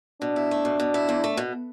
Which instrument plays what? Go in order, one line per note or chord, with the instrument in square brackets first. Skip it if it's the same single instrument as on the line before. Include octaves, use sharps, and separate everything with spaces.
[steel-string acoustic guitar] B2 [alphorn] D4
[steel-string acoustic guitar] E4
A3
B2
B2
E4
E2
A3
B2